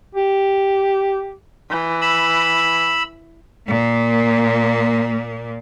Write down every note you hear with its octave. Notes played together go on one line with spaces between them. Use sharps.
G4
E3
B5 E6
A#2 A#3